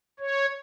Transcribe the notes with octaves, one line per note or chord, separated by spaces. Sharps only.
C#5